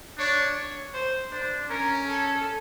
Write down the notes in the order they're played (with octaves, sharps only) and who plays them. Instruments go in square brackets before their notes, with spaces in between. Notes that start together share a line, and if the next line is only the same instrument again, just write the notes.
[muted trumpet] D4 [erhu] C#5
[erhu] C#5
C5
[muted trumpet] D4 [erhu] C5
[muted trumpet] C#4 [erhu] A#4
[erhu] A4